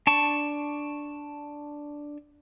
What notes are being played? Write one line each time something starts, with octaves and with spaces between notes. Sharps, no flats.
D4 A5 C#6